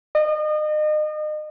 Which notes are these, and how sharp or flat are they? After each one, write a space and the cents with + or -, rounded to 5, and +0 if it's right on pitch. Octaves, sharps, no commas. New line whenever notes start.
D#5 -35